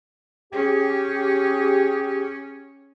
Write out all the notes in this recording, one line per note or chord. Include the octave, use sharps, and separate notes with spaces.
C#4 G4 G#4